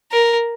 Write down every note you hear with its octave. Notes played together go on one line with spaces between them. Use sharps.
A#4